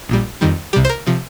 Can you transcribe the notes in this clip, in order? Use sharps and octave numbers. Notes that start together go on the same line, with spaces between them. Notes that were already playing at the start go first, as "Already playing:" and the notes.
A#1 A#2 G3
F2 D#3 G3
C2 C3 G3 G4
C5
A#4
C3 F3